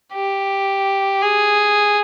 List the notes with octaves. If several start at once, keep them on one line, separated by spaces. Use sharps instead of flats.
G4
G#4